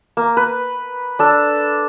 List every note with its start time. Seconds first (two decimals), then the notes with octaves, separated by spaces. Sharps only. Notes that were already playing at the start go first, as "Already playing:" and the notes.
0.17 A#3
0.37 B4
1.19 D4 A4